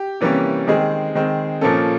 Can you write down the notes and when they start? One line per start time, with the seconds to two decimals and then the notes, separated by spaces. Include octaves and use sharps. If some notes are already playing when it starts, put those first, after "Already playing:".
Already playing: G4
0.21 C3 E3 G3 A#3 C#4
0.67 D#3 G#3 C4 G#4
1.15 D#3 G#3 C4
1.61 A#2 F3 A#3 C#4 A4